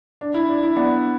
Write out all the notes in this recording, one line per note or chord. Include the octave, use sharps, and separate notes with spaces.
D4
E4
D4
E4
B3 D4